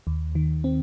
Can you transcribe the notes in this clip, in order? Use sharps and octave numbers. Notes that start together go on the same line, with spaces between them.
D#2
D#3
C4